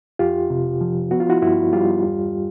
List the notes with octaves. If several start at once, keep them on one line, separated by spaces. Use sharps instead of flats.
F2 F4 G4
C3
F3
B3 F#4
F4
E4 F#4
G2 E4 F#4
G3 F4 G4
E2